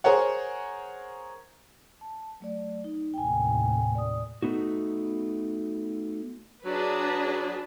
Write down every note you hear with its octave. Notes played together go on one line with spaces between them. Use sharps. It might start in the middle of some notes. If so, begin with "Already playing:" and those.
G#4 A#4 C5 C#5 F#5
A5
F#3 A3 D5
D#4
D#2 A2 C3 G5 G#5
D5 D#6
A3 B3 D#4 F#4
F#3 D4 G#4 B4